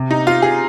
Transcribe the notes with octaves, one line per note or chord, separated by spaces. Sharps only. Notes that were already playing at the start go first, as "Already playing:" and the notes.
Already playing: C3
D#4
F4
G#4